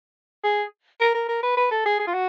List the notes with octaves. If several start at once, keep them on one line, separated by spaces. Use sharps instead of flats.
G#4
A#4
A#4
A#4
B4
B4
A4
G#4
G#4
F4
F#4